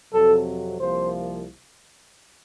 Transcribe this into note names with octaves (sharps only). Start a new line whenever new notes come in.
F2 C3 F#3 A4
C2 C3 F3 A#3 C5